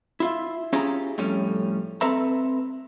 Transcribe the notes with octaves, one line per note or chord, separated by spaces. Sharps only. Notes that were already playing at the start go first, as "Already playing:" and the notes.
E4 F4 E5
C#4 E4 F4 G4 G#4 A#5
F2 A2 G3 C#4
C4 A4 B4 E5 A#5